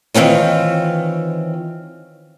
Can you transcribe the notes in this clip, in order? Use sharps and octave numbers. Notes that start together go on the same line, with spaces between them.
D#3 E3 C4 F4 C#5